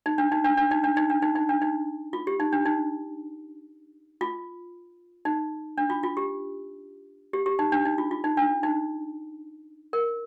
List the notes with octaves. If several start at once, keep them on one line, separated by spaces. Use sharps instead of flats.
D#4
D4
D#4
D4
D4
D#4
D4
D#4
D4
D#4
D#4
D4
D#4
F4
G4
D#4
D4
D#4
F4
D#4
D4
F4
F4
G4
G4
G4
D#4
D4
D#4
F4
F4
D#4
D4
D#4
A#4